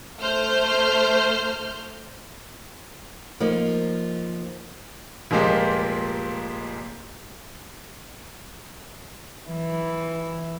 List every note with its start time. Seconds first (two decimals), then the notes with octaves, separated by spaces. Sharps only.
0.19 A3 C5 F6 G6
3.40 F3 A#3 D#4
5.31 F1 A#2 F3 G#3 A#3 G4
9.49 E3